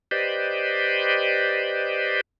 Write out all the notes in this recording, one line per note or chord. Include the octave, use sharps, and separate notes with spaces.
G4 B4 C5 D5 D#5